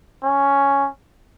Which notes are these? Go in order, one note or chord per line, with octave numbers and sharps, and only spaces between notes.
C#4